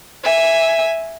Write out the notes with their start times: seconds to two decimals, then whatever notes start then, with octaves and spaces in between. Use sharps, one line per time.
0.24 E5 G#5